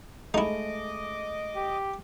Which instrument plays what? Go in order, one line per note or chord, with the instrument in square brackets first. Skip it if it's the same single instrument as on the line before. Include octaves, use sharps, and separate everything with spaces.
[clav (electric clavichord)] G#3 A3 [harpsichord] D#4 E4 [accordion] D#5 D6
[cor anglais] G4